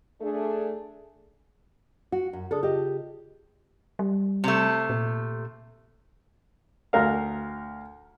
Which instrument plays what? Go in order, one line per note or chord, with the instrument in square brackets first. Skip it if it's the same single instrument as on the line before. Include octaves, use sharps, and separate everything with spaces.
[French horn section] A3 D4 G#4
[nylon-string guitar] F#4
F#2
[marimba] C#3 G#4 D#6 [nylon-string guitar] D4 A4
[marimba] F4 [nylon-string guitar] G4 D#5
[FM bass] G3
[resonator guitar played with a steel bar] C3 A3
[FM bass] A#2
[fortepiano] D2 A#4 F5